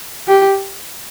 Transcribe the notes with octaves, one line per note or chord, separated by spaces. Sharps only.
G4